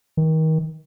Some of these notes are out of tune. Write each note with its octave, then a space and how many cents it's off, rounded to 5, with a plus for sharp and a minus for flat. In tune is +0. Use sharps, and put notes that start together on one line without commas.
D#3 +30